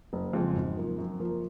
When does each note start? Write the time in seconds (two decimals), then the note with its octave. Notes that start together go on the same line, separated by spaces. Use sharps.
0.13 F#1
0.33 F2 C#3 F3 G#3
0.55 G#1
0.77 F#2 F3 A#3
0.98 F#2
1.20 F3 A#3